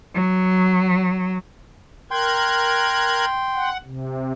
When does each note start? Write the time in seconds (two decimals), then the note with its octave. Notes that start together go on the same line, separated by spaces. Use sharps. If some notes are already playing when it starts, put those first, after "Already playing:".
0.15 F#3
2.11 A#4 G5 C6 F#6 G#6
3.55 F#5
3.84 C3